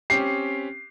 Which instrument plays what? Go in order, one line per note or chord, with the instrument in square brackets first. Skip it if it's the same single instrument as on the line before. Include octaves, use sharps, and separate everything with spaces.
[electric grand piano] C4 C#4 G4 [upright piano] C7